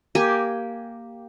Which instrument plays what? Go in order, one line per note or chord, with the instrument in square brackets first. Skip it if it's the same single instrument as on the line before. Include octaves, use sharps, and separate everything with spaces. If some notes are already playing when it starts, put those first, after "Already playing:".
[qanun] A#3 G4 G#5